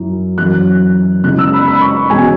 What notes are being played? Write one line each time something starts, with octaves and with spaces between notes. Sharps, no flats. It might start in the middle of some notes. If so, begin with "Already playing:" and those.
Already playing: F#2 F#3 E4
F#2 E3 C#4 F#6
C#3 G#3 C#4 E4 F#6
E6
B5
B5
C#6
E2 B2 G#3 C#4 G#5